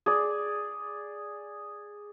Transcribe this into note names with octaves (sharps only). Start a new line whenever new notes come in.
G#4 D5